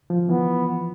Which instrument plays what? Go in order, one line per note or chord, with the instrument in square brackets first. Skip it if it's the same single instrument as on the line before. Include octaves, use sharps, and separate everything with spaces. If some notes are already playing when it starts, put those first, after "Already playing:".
[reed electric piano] F3
[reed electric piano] E3 [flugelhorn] B3